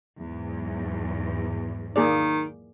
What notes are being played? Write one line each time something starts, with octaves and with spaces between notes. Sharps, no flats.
E2 G#2 F#3
D#3 A#3 G#4 D5